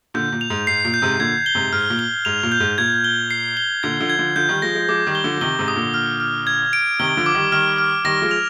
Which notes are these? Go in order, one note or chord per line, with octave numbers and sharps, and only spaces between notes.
A#2 D3 G6
A#2
F7
G#2
G#2 C7
A#2
G6
G#2 C3
A#2 D3 G#6
G7
G#2 C3
G#2 F6
A#2
G7
G#2 F7
A#2
G6
G#2
A#2 G#6
G7
C7
G7
A#2 D3 G#6
D3 F3
G#6
D3 F3
D3 F3 G6
D#3 G3
F3 G#3 A#6
F3 G#3
F3 G#3 D6
D#3 G3
G7
D3 F3
F3
C3 D#3 G7
G#2 C3
D#6
A#2 D3
F6
F6
G#6
D7
C3 D#3 G7
D3 F3
D6
D#3 G3
D#3 G3 F6
F6
D#3 G3 A#6
F3 G#3
F7